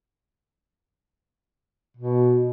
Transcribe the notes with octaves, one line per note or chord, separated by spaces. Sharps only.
B2